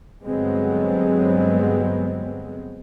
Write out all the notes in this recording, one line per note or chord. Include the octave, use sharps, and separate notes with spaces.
G2 D3 F#3 G#3 B3 C4